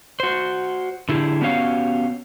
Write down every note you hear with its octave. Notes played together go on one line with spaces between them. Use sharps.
F#4 C5
D3 E4 G4 G#4
B3 C#4 F#4 G4 C#5 F5